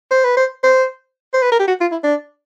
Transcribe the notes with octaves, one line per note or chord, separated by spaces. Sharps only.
C5
B4
C5
C5
C5
B4
A#4
G4
F#4
F4
E4
D4